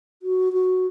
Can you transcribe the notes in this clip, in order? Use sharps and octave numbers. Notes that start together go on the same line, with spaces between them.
F#4
F#4